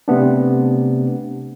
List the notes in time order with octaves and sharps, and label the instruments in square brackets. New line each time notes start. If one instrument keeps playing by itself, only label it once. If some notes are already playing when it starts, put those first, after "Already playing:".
[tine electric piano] C3 A3 B3 D4